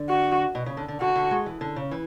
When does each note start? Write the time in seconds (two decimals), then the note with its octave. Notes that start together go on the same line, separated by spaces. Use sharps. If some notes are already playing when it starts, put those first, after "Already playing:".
Already playing: D3
0.09 F#4
0.55 B2
0.66 C#3
0.77 D3
0.88 D3
1.01 D3 F#4
1.16 D3
1.31 G#3
1.46 E3
1.61 D3
1.76 C#3
1.91 E3